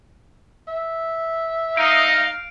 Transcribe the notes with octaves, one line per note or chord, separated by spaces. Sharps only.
E5
D#4 F5 D7